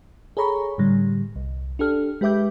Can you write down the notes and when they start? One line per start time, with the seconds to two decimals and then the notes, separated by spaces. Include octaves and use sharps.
0.37 G#4 A4 C#5 A#5 B5 C#6
0.78 A2 D3 G3
1.36 C2
1.79 D4 G4 A4 F6
2.21 G#3 G4 B4 E5 D6 G6